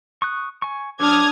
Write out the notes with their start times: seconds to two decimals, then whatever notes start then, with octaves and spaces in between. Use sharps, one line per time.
0.22 C#6 D#6 F#6
0.62 G#5 C#6
1.00 F#3 D4 D6 D#6 F6 G#6